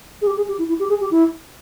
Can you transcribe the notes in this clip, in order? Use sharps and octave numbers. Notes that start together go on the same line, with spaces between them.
G#4
G4
G#4
G4
E4
E4
G4
G#4
G4
E4